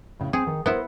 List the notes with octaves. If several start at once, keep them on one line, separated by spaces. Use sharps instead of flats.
A2 C#3
C4 G#4
D#3
B3 E4 A#4 C5